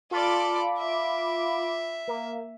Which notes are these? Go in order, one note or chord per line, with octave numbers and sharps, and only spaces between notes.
F4 A4 D5 B5 D6
E5
A#3